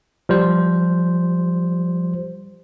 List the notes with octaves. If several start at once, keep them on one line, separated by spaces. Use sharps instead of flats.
F3 G3 C5